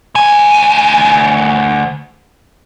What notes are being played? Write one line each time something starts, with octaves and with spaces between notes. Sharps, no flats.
D2 G#5